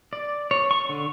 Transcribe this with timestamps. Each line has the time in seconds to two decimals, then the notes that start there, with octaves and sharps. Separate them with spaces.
0.13 D5
0.51 C#5
0.71 C#6
0.89 D3